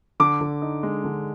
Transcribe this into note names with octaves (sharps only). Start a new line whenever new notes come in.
D3 D6
D3
D#4
G#3
D3